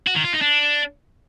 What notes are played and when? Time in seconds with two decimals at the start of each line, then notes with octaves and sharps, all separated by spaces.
0.07 F#4
0.16 D#3
0.24 F4
0.33 D#4
0.41 D4